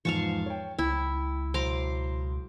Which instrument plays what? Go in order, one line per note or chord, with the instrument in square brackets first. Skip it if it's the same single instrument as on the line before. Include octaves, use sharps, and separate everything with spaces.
[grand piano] E2 G#2 F3 [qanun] F5 A5 C#6
[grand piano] C#5 G5
[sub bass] C#2 [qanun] E4 [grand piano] G5
[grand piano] B1 C5 [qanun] A#5 C6 D6